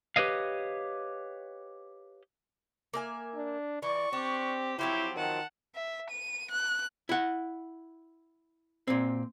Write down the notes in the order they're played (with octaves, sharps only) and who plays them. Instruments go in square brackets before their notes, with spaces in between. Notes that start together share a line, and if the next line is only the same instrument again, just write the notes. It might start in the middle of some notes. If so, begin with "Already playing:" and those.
[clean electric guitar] G4 B4 C#5 D#5 F5
[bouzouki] A#3 E5 G#5
[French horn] D4
[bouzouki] E3 [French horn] D5 [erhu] C#6
[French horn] C4 [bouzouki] D4 [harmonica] G4
[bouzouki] F3 F#3 C4 [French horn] E4 [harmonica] G4 C5 [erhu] C#5
[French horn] D#3 [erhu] F#5 [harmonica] A5
[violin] E5
D#7
F#6
[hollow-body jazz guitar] E4 F#5
A#2 C4